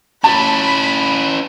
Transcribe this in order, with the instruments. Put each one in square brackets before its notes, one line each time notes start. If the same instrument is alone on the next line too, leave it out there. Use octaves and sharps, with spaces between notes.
[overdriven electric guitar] C#4 E4 [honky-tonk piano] A5 [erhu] B5